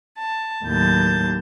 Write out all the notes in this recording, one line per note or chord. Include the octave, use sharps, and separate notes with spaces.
A5
D#2 A2 F#3 A5 G6 A6